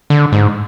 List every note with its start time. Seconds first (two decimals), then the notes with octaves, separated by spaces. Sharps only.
0.10 D3
0.32 G#2